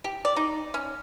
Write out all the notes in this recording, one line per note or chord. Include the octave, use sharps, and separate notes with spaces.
G4
D5
D#4
C#4